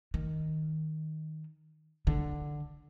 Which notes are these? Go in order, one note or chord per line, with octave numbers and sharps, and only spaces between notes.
D#3
D3